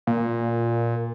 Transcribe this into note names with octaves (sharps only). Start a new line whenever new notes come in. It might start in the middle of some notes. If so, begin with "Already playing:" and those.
A#2